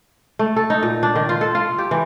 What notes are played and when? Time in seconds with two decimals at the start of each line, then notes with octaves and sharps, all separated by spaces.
0.39 A3
0.56 A4
0.70 D#4
0.83 A#2
1.03 D4
1.15 D#3
1.29 F4
1.41 A4
1.55 F4
1.78 G4
1.91 E3